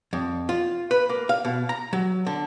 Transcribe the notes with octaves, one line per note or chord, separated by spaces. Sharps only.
F2
F4
B4
A#3
F5
B2
A#5
F#3
D3